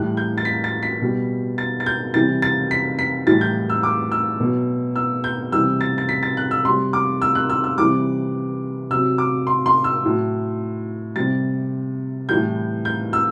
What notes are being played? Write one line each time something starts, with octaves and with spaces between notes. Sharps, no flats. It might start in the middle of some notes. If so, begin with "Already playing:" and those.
Already playing: A2 E3 G3 F#6
G6
A6
B6
A6
B6
B2 G3
A6
A6
G6
C3 E3 G3 A6
A6
B6
B6
A2 E3 G3 A6
G6
E6
D6
E6
B2 F#3
E6
G6
C3 E3 G3 E6
A6
A6
B6
A6
F#6
E6
C3 G3 C6
D6
E6
F#6
E6
E6
C3 E3 G3 D6
C3 F#3 E6
D6
C6
C6
E6
A2 F#3
C3 G3 A6
A2 E3 G3 G6
G6
E6